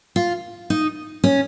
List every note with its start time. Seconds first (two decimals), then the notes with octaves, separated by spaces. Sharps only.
0.16 F4
0.70 D#4
1.24 C#4